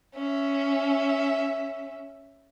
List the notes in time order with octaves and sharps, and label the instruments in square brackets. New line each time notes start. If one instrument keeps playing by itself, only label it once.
[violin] C#4 E5